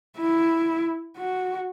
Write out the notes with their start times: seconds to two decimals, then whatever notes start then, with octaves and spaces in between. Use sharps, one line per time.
0.17 E4
1.17 F#4